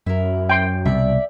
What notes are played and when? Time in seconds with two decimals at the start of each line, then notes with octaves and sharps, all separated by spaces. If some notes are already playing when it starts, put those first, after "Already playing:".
0.06 F#2 E4 A#4
0.49 G5 C6
0.85 C2 B2 D5 E5